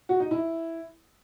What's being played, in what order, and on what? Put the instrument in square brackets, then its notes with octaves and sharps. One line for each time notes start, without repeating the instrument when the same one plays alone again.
[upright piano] F#4
D#4
E4